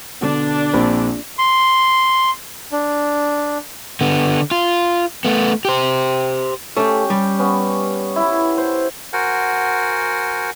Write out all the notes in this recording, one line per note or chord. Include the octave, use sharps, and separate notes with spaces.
B2 D3 D4
A#1 C4 B5
C6
D4
D3 B3
F4
A3 B3
G4 C5
A3 C#4 G4
G3
B3 C#4
E4
C5
F#4 A#4 C5 F#5 G#5